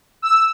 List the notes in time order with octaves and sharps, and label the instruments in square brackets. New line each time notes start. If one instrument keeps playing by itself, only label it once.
[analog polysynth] E6